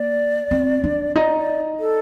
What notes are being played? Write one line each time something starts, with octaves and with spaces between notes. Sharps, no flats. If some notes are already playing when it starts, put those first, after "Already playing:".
Already playing: A#3 D5
C4
D4
D#4 D5
D5
A4